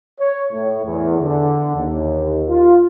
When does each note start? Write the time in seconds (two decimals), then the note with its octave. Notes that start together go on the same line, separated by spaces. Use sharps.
0.19 C#5
0.52 A2
0.85 E2
1.20 D3
1.76 D#2
2.48 F4